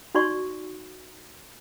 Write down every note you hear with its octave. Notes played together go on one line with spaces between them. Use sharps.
D#4 F#4 D5 C6 C#6